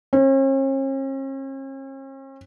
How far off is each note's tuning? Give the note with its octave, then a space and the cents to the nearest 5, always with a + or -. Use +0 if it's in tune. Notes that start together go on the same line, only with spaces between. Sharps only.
C#4 -45